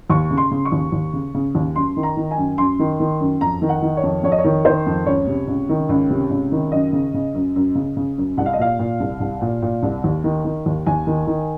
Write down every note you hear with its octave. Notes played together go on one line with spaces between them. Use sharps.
D#2 C#6
C#3
C6
C#3
C#6
D#2
D#2
C#3
C#3
D#2
F#2 C6
D#3
A#5
D#3
G#5
F#2
F#2 C6
D#3
D#3
F#2
F2 A#5
D#3
F#5
D#3
C#5
F2
F2 C#5
D#5
C#5
D#3
D#3 C5
F2
C#2 C#5
C3
C#2
D#3
C#2
C3
C#2
D#3
F#2 D#5
C#3
C#3
F#2
F#2
C#3
C#3
F#2
C2 F#5
F5
D#5
A#2 F5
A#2
C2
C2
A#2
A#2
C2
D#2
D#3
D#3
D#2
D#2 G#5
D#3
D#3